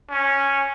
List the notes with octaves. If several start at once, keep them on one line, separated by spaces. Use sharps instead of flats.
C#4